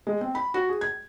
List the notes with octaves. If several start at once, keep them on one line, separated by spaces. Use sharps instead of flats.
G#3
C4
B5
F#4
G#4
G#6